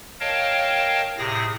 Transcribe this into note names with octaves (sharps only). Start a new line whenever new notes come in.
A#4 C#5 D#5 F5 G5 A5
A2 C3 G#4 D#6 A#6